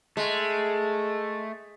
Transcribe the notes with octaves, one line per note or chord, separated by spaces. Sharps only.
G#3 A3